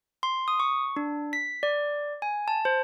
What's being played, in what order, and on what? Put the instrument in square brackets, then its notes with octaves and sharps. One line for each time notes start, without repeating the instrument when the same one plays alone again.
[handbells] C6
D#6
C#6
D4
B6
D5
G#5
A5
C5